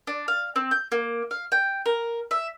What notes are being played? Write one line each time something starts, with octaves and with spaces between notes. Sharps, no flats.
D4
F5
C4
G6
A#3
F5
G5
A#4
E5